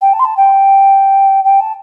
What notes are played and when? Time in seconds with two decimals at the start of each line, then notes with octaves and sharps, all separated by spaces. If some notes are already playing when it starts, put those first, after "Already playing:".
0.01 G5
0.13 A5
0.19 C6
0.25 A5
0.37 G5
1.44 G5
1.60 A5